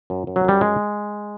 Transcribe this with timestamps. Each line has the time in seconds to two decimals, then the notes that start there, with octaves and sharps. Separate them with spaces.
0.10 F#2
0.27 F#2
0.36 F#3
0.45 F#2 G3
0.61 G#3